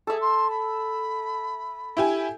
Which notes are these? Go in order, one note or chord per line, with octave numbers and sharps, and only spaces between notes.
G#4 A4 E5
C6
B5
E4 G4 G#5